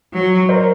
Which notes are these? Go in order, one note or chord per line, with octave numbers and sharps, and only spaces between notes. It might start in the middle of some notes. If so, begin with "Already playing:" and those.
F#3
A#4 C5